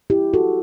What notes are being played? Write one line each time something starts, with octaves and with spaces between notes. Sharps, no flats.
E4 G4
F#4 A4